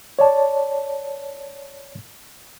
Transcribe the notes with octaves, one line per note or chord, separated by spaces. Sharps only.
C#5 D5 A5